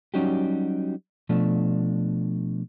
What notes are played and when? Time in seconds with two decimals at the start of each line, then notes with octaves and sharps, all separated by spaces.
0.14 F#3 G3 C#4 D#4 F#4 G4
1.29 B2 F3 A3 D4